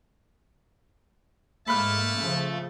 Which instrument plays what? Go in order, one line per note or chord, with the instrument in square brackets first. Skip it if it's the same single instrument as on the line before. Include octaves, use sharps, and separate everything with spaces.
[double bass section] G#2 A#3 [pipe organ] A3 A4 [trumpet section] E4 A5 [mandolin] B5 F6
[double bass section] C#3 F3